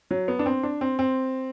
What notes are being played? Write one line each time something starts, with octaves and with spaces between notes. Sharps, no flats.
F#3
B3
D4
C4
D4
C4
C4